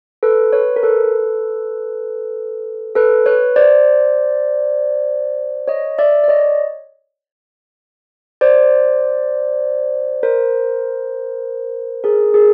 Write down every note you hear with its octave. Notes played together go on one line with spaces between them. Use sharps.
A4 B4
B4 C#5
A#4
A4 B4
A4 B4
B4 C#5
C5 D5
C#5 D#5
D5 E5
D5
C#5 D#5
C5 D5
A#4 C5
G#4 A#4
G#4 A#4